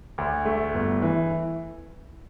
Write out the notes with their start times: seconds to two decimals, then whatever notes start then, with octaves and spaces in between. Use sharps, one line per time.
0.18 D2
0.45 A3
0.74 G1
1.02 E3